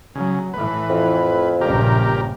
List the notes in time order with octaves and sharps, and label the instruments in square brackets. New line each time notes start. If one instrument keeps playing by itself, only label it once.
[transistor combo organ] C#3 [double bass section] F#3
[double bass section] A2 E3 [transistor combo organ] B4
[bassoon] F2
[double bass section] A#1 G2 C#3 [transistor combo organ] G4 A#4